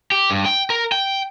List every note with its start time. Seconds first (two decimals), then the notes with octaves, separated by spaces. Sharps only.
0.12 G4
0.31 G2
0.45 G5
0.70 A#4
0.92 G5